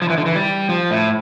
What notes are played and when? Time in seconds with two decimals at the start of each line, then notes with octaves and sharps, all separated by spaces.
0.02 F3
0.10 E3
0.18 D3
0.26 E3
0.36 G3
0.69 F3
0.91 A2